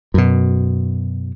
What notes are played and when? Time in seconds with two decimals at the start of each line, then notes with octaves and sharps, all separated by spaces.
0.14 F#2 B2